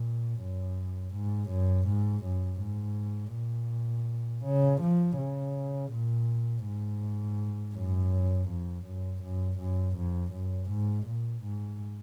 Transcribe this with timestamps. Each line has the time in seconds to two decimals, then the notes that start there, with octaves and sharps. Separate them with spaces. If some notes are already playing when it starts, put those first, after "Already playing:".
Already playing: A#2
0.41 F#2
1.14 G#2
1.50 F#2
1.87 G#2
2.24 F#2
2.60 G#2
3.34 A#2
4.45 C#3
4.81 F3
5.17 C#3
5.92 A#2
6.65 G#2
7.75 F#2
8.49 F2
8.86 F#2
9.23 F#2
9.59 F#2
9.96 F2
10.32 F#2
10.70 G#2
11.06 A#2
11.43 G#2